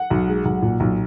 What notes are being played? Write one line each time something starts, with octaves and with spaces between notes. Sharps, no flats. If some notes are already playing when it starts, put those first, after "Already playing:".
Already playing: F#5
B1
G#3
B1
A#2
B1